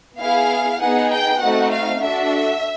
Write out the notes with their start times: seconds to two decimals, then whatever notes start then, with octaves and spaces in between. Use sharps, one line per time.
0.19 B3 E4 G#4 F5
0.80 B3 D#4 G#4 F#5
1.11 G5
1.41 A3 C4 D#4 F#4 F#5
1.72 F5
2.01 D4 F#4 A4 E5